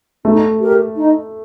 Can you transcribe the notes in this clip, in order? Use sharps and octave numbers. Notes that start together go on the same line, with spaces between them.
A3 D#4
G4 A#4
D#4